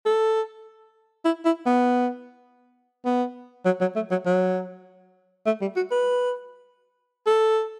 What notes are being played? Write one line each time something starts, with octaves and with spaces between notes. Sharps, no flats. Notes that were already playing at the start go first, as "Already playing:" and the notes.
A4
E4
E4
B3
B3
F#3
F#3
A3
F#3
F#3
A3
G3
F#4
B4
A4